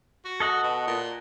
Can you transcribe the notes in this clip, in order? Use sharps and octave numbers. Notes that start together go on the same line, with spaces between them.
F#4
A4 D#5 F#5
B2
A#2